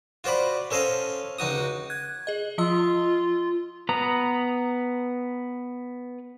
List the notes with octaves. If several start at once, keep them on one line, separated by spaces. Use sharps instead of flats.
F4 F#4 C5 D5 B5
C#4 A4 C5 D#5 F5
C#2 D#4 F#4 D#6
F#6 G#6
G#4 D#5
F3 F4 D#5 E6
B3 B4 A#5 D#6